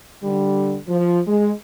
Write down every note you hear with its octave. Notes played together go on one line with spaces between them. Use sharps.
D3 G3
F3
G#3